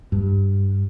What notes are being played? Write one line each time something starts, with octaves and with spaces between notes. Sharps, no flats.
G2